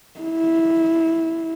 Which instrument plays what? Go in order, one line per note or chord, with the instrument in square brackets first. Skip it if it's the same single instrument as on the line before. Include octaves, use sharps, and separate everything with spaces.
[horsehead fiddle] E4